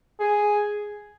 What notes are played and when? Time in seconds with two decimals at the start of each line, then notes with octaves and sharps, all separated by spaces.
0.20 G#4